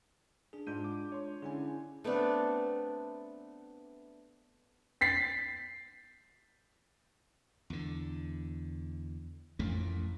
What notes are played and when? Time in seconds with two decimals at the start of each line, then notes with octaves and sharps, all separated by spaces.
0.53 D4 G#4
0.67 G#2 G#3 D4 F4 G6 D#7
0.84 D6
1.12 C#5 C6
1.42 D3 C#4 E4 G#4 G#5
2.04 A3 B3 C4 D4
5.01 A6 B6 C7
7.70 E2 D3
9.59 A1 F2 A#2 A3